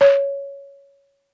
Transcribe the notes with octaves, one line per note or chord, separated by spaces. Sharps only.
C#5